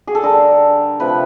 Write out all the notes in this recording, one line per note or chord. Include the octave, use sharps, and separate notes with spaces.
G#4
A4
D3 G3 A#4
C3 F3 A3 B4